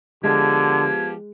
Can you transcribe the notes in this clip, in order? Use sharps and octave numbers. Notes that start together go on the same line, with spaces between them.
D3 F3 G#3 B3 G4 G#6